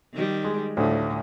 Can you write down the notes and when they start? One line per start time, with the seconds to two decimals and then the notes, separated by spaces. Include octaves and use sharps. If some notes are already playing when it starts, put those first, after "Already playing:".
0.13 D#3 G3
0.44 G#3
0.77 D2 A2 D3 F3